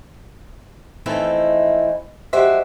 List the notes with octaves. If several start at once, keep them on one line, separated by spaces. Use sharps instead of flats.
E3 F3 A3 C4 D#4 E4
F3 G#3 F#4 G4 C5 E5